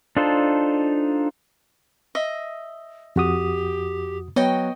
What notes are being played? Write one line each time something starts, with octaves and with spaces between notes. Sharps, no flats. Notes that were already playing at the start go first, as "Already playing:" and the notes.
D4 D#4 F4 A4 C5
D#5 E5
F2 F#4 G4 D#6
F#3 B3 C#5 D#5 G5